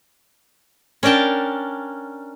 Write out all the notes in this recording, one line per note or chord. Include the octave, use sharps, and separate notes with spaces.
C#4 D4 A#4 G5 A5